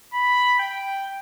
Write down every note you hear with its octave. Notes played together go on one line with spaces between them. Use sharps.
B5
G5